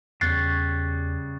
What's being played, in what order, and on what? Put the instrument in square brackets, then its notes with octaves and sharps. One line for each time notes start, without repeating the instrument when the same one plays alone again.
[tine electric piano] E2 [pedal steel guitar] C#3 G3 C#5 [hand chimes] F#6 A6 C7